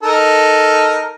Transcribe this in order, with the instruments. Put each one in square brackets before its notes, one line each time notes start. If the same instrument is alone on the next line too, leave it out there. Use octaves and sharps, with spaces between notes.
[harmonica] D#4 A4 A#4